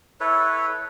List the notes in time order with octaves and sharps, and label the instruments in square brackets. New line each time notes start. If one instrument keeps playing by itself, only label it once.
[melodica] E4 A4 B4 C#5